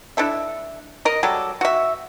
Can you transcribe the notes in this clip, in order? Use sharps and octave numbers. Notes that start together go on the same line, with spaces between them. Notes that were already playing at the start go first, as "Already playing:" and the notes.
D4 E4 A4 E5
A#4 D#5
F#3 G3 A4
F#4 E5